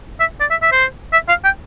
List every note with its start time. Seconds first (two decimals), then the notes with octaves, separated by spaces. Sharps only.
0.20 E5
0.40 D5
0.51 E5
0.62 E5
0.72 C5
1.13 E5
1.29 F5
1.45 G5